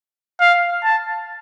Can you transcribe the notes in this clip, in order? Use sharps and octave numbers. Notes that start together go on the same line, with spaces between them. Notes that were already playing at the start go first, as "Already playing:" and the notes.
F5
A5